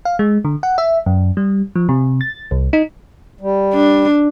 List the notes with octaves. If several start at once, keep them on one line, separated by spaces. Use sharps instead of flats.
F5
G#3
D3
F#5
E5
F#2
G3
F3
C3
A6
C2
D#4
G3
D4